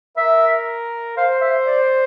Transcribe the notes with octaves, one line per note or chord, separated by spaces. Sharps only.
A#4 E5
C5 F5
E5
D5